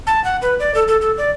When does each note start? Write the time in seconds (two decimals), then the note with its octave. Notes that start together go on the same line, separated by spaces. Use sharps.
0.07 A5
0.24 F#5
0.42 B4
0.60 D5
0.75 A4
0.88 A4
1.02 A4
1.18 D5